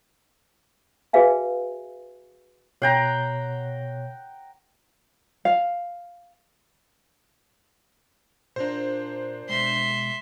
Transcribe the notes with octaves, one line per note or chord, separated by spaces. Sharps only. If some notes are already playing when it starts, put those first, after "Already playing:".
F#4 G#4 B4 E5 F5 G#5
B2 C#5 F#5 G5 A#5 C7
F5
A#2 D4 F4 A#4 C5
B2 G#3 E5 C6